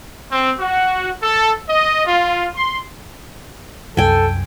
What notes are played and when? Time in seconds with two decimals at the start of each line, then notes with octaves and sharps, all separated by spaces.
0.31 C4
0.59 F#4
1.23 A4
1.68 D#5
2.06 F4
2.56 C6
3.97 C2 F#2 A4 G5 G#5